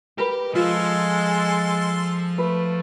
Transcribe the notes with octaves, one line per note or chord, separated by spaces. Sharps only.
G4 A#4 B4
F3 G#3 F4 A4 C5 C6
A3 B4